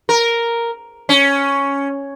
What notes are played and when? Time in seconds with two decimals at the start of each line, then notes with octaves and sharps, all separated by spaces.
0.09 A#4
1.09 C#4